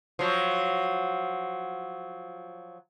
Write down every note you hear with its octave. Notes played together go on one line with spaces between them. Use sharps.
F3 F#3